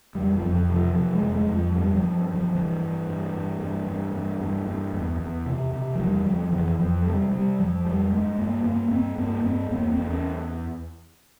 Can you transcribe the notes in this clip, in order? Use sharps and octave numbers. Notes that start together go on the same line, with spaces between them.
F2 G3
F3
F2
F3
C3
F3
C3 F3
G#3
F2
G#3
F2
F3
G2 G3
F3
G2
G2
F3
G2 E3
G2
G2
G2
G2
G2
G2
G2
G2
E2
E2
C3
C3
F3
E2 G3
E2 F3
F2 E3
F2 F3
C3 G3
C3 G3
F2 F3
F2 G3
G2 G#3
G2 A#3
G2 A#3
G2 C4
G2 A#3
G2 C4
E2 A#3
C4
E2
C#4